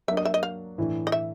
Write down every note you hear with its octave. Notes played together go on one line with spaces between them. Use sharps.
F#3 A#3 D4 E5
D#5
E5
D#5
F5
A2 E3 A3 D4
D#5
E5